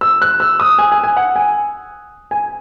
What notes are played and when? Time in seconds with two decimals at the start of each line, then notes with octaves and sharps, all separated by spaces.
0.01 E6
0.22 F#6
0.40 E6
0.60 D#6
0.79 G#5
0.92 G#5
1.04 G#5
1.17 F#5
1.36 G#5
2.31 G#5